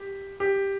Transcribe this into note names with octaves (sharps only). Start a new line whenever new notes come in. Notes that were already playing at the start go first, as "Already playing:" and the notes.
Already playing: G4
G4